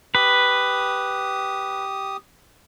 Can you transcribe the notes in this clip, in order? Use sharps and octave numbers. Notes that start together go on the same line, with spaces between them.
G4 B4 D#6